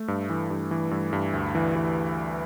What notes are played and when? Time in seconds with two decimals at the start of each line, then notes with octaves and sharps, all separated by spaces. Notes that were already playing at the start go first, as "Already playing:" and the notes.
Already playing: A3
0.08 G2
0.30 E3
0.50 G2
0.71 E3
0.91 G2
1.13 G2
1.33 D2
1.55 E3
1.76 E3